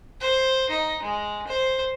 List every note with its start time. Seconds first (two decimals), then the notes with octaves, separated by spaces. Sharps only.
0.21 C5
0.70 D#4
1.03 G#3
1.48 C5